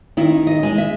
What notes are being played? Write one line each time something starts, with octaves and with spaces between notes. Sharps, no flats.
D#3 E4
D#5
G#3
E5